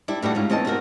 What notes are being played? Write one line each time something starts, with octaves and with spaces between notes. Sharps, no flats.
G3 D4 E4
A2 G3 D4 F#4
G#2 C#4 F4
E2 C4 C#4 D#5 A5
C3 F4 F#4 A#4